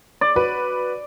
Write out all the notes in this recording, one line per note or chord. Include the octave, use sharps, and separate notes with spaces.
D5
F#4 B4